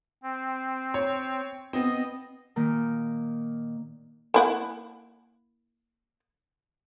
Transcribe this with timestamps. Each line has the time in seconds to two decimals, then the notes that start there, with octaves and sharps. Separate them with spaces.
0.23 C4
0.94 C#5
1.73 B3 C4 D#5
2.56 A#2 D#3 A#3
4.34 A#3 E4 F#5